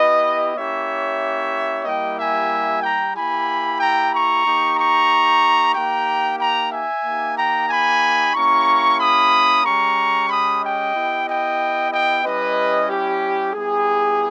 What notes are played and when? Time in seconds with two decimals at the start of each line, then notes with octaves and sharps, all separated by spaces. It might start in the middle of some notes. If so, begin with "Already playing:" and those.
Already playing: B3 E4 G4 B4 D#5
0.55 A#3 C#4 E4 G4 C#5 E5
1.84 G3 A#3 E4 G4 D#5 G5
2.17 E5 G#5
2.82 G5 A#5
3.14 A#3 E4 G4 G#5 B5
3.80 G5 A#5
4.12 A#5 C#6
4.45 A#3 D#4 G4
4.77 A#5 C#6
5.74 A#3 D#4 G4 G5 A#5
6.39 G5 A#5
6.72 E5 G#5
7.04 A#3 D#4 G4
7.37 G5 A#5
7.69 G#5 B5
8.35 A#3 C#4 E4 G4 A#5 C#6
8.99 B5 D#6
9.64 G#3 C#4 G4 A#5 C#6
10.29 B5 D#6
10.61 D#5 G5
10.94 B3 E4 G4
11.26 D#5 G5
11.91 D#5 G5
12.24 G3 C#4 E4 G4 B4 D#5
12.89 G4
13.53 G3 B3 E4 G4 G#4